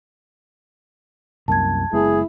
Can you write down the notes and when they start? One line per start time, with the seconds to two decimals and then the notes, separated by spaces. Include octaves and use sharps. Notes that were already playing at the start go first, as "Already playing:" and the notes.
1.48 C2 F#2 A#3 A5 G#6
1.93 F#1 G#3 B3 E4 G#4